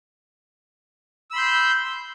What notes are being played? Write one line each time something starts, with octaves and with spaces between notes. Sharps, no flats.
B5 C6 E6 G6